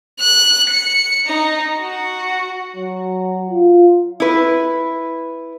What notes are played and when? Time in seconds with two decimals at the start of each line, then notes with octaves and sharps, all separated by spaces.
0.20 F#6
0.70 C#7
1.27 D#4
1.79 F#4
2.76 F#3
3.50 F4
4.20 E4 B4